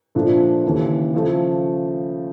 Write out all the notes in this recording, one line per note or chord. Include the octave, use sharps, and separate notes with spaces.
A#2 F3 A3 D4
D#2 C#3 E3
C#3 F3 A3